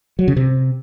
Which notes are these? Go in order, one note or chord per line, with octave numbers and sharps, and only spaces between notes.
F#3
C#3
C3